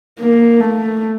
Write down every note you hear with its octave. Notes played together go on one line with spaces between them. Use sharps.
A#3
A3